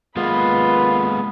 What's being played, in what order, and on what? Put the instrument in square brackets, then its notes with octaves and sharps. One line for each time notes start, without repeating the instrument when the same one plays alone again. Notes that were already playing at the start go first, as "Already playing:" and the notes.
[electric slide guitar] G#3 A#3 [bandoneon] B3 [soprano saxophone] F4 [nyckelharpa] B4 B5